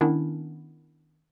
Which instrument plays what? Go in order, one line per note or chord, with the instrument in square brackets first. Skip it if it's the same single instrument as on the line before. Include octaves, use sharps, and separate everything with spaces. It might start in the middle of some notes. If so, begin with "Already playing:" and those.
[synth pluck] D#3 B3 C#4 D4 E4